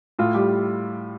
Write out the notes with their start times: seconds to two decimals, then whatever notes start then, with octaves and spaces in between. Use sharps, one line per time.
0.19 A2 F4
0.34 G3 G4